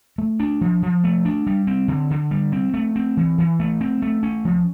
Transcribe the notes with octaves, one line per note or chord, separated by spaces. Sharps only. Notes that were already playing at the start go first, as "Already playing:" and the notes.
A3
D4
F3
F3
A3
D4
G3
C4
D3
D3
G3
C4
A3
C4
E3
E3
A3
C4
A3
C#4
F3